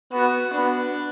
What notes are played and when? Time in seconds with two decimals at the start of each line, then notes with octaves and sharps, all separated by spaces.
0.13 B3 F#4
0.56 B3 D4